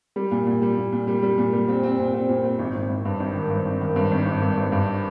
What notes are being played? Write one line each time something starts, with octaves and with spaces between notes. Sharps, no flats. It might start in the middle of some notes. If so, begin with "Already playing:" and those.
G3
A#2
A#2
G3
A#2
A#2
G3
G3
A#2
G3
C4
C4
A#2
C4
A#2
C4
G#1
G#1
G#1
G2
G#1
D#3
G2
G#1
D#3
G2
G#1
G#1
G2
G2
G2